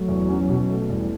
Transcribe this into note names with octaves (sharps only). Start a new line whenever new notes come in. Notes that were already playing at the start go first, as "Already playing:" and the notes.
Already playing: F#3 A3
E2
C#4
B2
A3
E2 G3